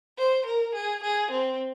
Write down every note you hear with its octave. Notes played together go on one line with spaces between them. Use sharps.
C5
A#4
G#4
G#4
C4